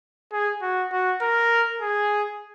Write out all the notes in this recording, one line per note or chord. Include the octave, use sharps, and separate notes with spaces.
G#4
F#4
F#4
A#4
G#4